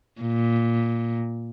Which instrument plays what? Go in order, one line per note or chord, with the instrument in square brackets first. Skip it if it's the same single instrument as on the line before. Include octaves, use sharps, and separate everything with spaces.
[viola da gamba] A#2